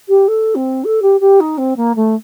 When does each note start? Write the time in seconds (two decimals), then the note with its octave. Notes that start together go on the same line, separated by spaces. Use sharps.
0.09 G4
0.28 A4
0.55 C4
0.84 A4
1.02 G4
1.20 G4
1.40 D#4
1.58 C4
1.77 A#3
1.96 A3